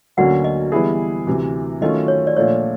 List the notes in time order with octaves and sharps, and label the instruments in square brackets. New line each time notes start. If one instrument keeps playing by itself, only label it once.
[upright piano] D2 D3 F#3 A#3 C#4 [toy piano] F#5
[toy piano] D#5
[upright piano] E3 G3 B3 E4 G#4
D2 C3 E3
[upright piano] D#3 F#3 A3 C#4 F4 [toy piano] D#5
[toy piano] C#5
D5
[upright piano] A#2 F3 A3 D4 [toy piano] C#5